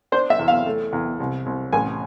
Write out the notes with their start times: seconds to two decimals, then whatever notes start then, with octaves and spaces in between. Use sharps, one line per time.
0.12 D4 C5
0.30 E5
0.39 E2
0.48 F5
0.66 A3
0.93 E2
1.20 C2
1.46 C2
1.73 A1 G#5